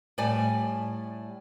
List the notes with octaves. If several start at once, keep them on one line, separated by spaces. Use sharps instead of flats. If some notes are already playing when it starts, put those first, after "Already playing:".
A2 G3 D5 G#5 A5